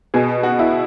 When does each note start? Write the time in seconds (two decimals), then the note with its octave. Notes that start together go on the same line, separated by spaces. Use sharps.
0.14 B2 G#4
0.43 F#4
0.59 E4